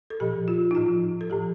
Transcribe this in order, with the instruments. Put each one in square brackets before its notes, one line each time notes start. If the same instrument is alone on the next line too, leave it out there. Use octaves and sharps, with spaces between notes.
[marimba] A4
A#2 F3 G4
F4
D#4
A2 F3 F4
A4
A2 F3 G4